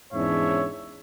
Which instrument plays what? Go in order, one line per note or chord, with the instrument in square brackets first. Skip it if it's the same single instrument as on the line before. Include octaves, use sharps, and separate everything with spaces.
[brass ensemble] E2 G#2 C#4 D4 C#5 E5